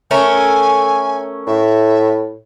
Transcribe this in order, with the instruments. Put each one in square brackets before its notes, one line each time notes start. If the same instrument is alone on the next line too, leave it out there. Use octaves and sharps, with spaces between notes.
[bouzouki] A3 C#4 A#4 [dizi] G#5
[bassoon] A2 [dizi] E5